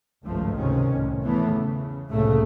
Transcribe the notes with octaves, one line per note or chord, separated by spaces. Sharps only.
G#1 C#2 G2 F3 A3
C#2 C3 D#3 C#4
C2 A2
E2 A2 E3 A3 B3
C#3
F1 C2 A2 C#3 A3 A#3